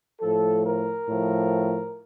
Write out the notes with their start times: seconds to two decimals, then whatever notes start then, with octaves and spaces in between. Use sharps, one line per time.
0.20 A2 F3 A4
0.65 A#4
1.09 A2 F3